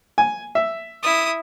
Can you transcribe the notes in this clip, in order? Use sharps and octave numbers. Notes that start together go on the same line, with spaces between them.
G#5
E5
E4 D#6